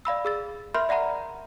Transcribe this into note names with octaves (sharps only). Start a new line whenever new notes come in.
D5 F5 B5 E6
G#4 E6 A6
A#4 E5 B5 C6 F6 G6
D5 E5 F#5 A#5 B5